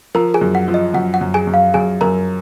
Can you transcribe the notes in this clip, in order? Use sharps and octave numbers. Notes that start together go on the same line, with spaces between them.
F3 A#4 A#5
G#4 G#5
F#2
F#5
F3
D#5
F#2 F#5
F#5
F#2
G#4 G#5
F#2
F5
F#2 G#4 G#5
F#2 A#4 A#5